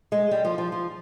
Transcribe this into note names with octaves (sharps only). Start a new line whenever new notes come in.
G#3
G3
F3
F3
F3